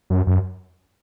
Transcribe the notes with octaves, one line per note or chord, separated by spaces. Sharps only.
F#2
F#2